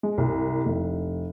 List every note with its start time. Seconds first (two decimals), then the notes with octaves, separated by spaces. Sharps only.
0.03 G#3
0.18 C2
0.65 F1